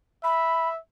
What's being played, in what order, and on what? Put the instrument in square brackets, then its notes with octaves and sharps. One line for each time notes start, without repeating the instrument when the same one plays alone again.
[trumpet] E5 [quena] B5